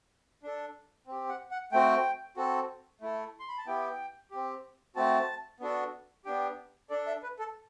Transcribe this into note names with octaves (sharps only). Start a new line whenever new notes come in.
D4 A4
C4 G4
F#5
F#5
A3 C4 F#4 G5
C4 F#4 A4
A3 E4 A4
C6
B5
A5
B3 E4 G4 G5
C4 G4
A3 C4 F#4 A5
B3 D4 F#4 A4
B3 D4 G4 G5
D4 A4 D5
E5
B4
A4